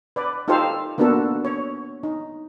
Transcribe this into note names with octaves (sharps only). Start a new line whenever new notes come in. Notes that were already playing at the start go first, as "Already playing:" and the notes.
B4 D5
D#4 F4 G4 A4 C5 F5
A#3 B3 D4 F#4 A4 A#4
C#5
D#4